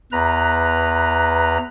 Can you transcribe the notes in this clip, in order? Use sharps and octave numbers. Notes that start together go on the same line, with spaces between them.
E2 B4 A#5